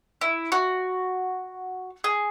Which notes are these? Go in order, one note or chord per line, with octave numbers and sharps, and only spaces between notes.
E4
F#4
G#4